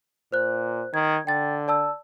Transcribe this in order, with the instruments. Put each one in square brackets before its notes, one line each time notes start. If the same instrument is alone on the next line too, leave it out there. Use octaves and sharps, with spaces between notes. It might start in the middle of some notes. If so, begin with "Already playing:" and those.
[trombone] A#2 [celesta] C5 F#6
[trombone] D#3 [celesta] G#6
[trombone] D3 [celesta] G5 A6
[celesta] D5 A5 E6